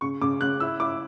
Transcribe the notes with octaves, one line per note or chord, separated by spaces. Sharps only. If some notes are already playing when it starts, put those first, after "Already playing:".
C#3 C#6
C#3 D6
C#3 F#6
E4 E6
E4 D6